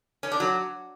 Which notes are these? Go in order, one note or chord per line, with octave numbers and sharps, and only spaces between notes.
C#4
D4
F#3